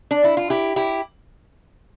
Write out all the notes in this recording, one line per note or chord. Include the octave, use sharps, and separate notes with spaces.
D4
E4
F4
E4 G4
E4 G4